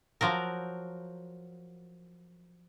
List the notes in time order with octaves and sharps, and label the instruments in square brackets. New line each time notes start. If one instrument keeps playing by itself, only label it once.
[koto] F3 F#3 A#4